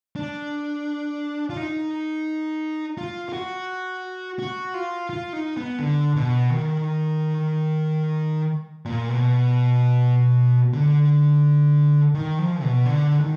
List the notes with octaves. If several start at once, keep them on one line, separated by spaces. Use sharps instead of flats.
D4
F4
D#4
F4
F4
F#4
F#4
F4
F4
D#4
B3
D3
B2
D#3
A#2
B2
D3
D#3
F3
B2
D3
D#3